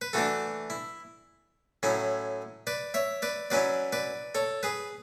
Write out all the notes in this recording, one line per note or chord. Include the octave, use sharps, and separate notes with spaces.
B4
E3 A3 D4 F#4 A4
E4
A2 F#3 C#4 E4
B4 D5
C#5 E5
B4 D5
F#3 C#4 E4 B4 D5
B4 D5
A4 C#5
G#4 B4